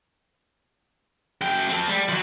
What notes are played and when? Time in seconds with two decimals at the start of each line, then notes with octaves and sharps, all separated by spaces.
1.42 F#2 G5
1.69 C4 A4
1.89 G3
2.09 F3 F#3